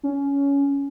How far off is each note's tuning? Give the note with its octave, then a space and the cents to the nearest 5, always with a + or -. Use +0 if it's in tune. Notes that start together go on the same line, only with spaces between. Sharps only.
C#4 +15